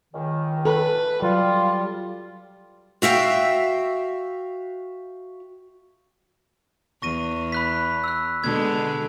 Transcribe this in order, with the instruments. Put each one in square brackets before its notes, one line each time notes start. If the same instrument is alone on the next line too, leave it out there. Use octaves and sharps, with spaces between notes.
[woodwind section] C#2 D#3
[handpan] A4 [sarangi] B4
[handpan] F#3 [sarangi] G3 [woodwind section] F4
[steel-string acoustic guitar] F#4 E5 F5 G5
[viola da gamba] E2 [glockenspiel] C#6 A#6 D#7
[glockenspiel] B5 F#6 B6
E6 F#6
[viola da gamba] B2 D3 G#3 [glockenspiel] G#6